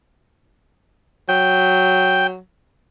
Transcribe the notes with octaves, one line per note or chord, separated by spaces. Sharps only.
F#3 G5